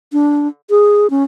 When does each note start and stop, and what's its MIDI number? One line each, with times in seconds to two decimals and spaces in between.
0.13 0.48 62
0.70 1.10 68
1.10 1.24 61